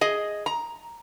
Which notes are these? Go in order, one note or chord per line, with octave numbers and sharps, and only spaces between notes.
G#4 D#5
A#5